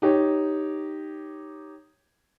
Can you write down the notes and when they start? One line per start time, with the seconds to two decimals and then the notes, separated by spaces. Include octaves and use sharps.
0.02 D#4 G4 C#5